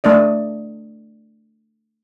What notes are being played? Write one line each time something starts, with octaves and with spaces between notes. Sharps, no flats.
A3 D4 D5 D#5